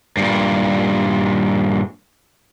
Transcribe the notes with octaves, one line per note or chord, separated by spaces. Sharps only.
G2 A#2